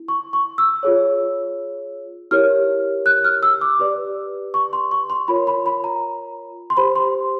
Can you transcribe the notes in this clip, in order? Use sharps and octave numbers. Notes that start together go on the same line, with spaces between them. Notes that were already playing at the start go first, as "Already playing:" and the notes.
Already playing: E4
C#6
C#6
E6
F4 G#4 C#5
E4 G4 A#4 C#5 F6
F#6
F6
E6
D6
G4 B4 D5
C#6
C6
C#6
C6
F4 A#4 C#5 B5
B5
B5
A#5
C6
G4 C5 B5
C6